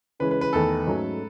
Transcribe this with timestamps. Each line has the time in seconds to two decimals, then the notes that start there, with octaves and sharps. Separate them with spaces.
0.20 C#3 E3 G#3 C#4 B4
0.31 B4
0.41 B4
0.53 E2 D#3 A3 A4
0.87 G#2 F#3 A3 C#4